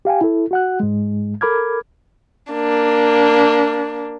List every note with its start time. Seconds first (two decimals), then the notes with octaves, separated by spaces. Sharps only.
0.05 G4 F5 G5 G#5
0.21 E4 A4
0.51 F#4 F#5 F#6
0.80 G#2 G#3
1.41 A4 A#4 B5 D6 F6 G#6
2.52 A#3 D4